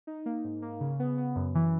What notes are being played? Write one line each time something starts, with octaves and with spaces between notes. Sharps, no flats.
D#4
A#3
G#2
A#3
C#3
B3
B3
F#2
E3